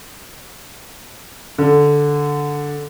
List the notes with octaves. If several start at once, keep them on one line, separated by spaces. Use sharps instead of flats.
D3